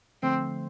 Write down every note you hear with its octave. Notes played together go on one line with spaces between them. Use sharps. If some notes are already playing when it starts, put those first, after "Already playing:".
D3 F3 A3 C4